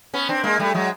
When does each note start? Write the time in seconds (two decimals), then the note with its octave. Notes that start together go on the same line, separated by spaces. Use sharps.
0.14 B3 C#4
0.29 C4 D4
0.44 G#3 A#3
0.59 G3 A3
0.74 F#3 G#3